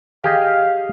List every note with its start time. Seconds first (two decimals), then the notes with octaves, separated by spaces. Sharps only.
0.24 G4 G#4 D#5 F5